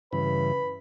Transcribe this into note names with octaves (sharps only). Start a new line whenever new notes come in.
G2 C#3 E3 B4 B5